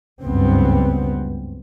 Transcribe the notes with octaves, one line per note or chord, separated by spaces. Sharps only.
F#1 C#2 G2 B3 C4